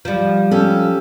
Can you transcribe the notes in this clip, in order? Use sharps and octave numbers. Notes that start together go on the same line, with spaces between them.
F3 G3
C#4 G4 A4